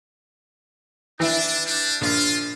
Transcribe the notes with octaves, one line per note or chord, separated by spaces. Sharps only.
E3 D4 E4
G3 D4
A#1 F4